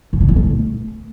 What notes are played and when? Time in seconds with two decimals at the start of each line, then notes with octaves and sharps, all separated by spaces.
0.13 A2
0.21 D3
0.28 A#2
0.36 A3